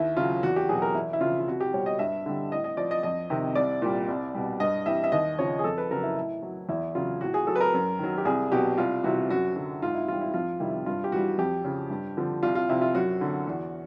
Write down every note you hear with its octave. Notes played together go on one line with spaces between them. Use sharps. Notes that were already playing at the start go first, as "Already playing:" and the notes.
Already playing: D#2 E4
C#3 F#3 F4
E2 F#4
G4
B2 F#3 G#4
A#4
E2 E4
E4
C#3 F3 F4
F4
C2 F#4
G4
B2 G3 C#5
D#5
G2 E5
D3 G3
A2 D#5
D#5
F3 D5
D#5
F2 D#5
C3 D#3
C2 D5
A#2 G3
C2
B2 G3
G2 D#5
E3 G3 E5
E5
D#2 D#5
C#3 F3 C#5
G#4
F2 A4
B4
C#3 F#3 A#4
E4
A2 E4
F#3
E2 E4
C#3 F#3 F4
A2 F#4
G#4
F#3 A4
B4
A#4
F#2
D#3 F#3
G4
C2 G#4
B2 F#3 G4
C2 F4
C3 E3 G3 F#4
F#2 F#4
D3 F#3 F#4
G#2 F4
E4
E3 G3 F4
E4
F2 F4
C3 D#3 G3 E4
G2 F4
G4
E3 G3 F#4
F2 G4
C#3 F3
G2
D3 F3
C2 F4
F4
C3 F3 E4
F4
F#2 F#4
D3 F#3
E2